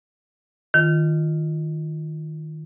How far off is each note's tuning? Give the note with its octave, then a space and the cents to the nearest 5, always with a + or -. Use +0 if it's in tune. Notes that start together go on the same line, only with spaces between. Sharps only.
D#3 +0 F4 -15